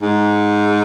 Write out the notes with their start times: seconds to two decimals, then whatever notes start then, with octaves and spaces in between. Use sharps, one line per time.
0.02 G#2